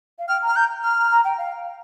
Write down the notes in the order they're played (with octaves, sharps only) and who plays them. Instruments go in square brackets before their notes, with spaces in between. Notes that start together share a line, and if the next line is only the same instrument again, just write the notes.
[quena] F5
[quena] G5 [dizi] F6
[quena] A#5
[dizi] F6
[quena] A#5 [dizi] G6
[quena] A#5 [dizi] F6
[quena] A#5
A#5
G5
F5